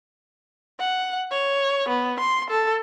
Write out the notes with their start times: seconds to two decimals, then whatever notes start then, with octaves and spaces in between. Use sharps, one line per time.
0.80 F#5
1.31 C#5
1.88 B3
2.20 C6
2.50 A4